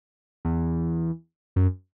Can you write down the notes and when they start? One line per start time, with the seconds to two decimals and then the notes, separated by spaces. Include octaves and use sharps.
0.45 E2
1.56 F#2